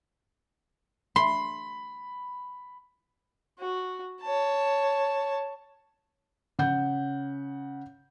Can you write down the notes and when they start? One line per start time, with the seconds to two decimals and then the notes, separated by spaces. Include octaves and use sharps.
1.16 B5 C6
3.59 F#4
4.22 C#5 A5
6.59 C#3 F#5 G6